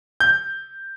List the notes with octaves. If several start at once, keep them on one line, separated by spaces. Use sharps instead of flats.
G6